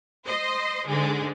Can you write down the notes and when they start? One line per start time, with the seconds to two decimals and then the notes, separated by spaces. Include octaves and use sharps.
0.25 C5 D#5 C6
0.87 G#2 D3 G#3